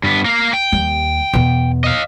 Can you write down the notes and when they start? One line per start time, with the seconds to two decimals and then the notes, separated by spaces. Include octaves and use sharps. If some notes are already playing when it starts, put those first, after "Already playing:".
0.04 G2 B3
0.25 A#3 F5
0.53 G5
0.72 D#2 G3
1.33 E2 B2
1.84 D#5 F5